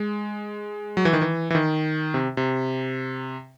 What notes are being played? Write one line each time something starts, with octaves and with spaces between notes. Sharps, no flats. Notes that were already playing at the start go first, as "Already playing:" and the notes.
Already playing: G#3
F#3
E3
D#3
E3
E3
D#3
C3
C3